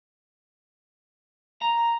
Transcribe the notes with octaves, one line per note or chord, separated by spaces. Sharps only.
A#5